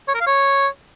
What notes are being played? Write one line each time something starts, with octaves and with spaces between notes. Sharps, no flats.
C#5
A#4
F5
C#5